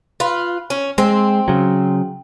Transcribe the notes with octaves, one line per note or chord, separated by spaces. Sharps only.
F4 B4
C#4
G#3 C4
C#3 F#3